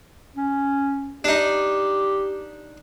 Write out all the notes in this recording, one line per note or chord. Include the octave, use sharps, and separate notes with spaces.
C#4
D4 D#4 G4